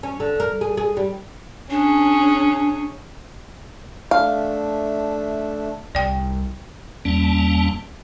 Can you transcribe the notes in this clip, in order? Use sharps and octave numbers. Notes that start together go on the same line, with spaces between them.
C#4
D3
A#4
G#4
G#4
G3
C#4 D4 G#4
A3 D4 E5 F5
C2 D5 G5
E2 G3 A#3 C#4 A5